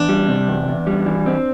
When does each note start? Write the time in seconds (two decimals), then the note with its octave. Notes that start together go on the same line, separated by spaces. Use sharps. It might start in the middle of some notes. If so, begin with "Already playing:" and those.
Already playing: E2 D4
0.09 G3
0.28 C3
0.48 E2
0.68 E2
0.87 G3
1.06 E3
1.26 C4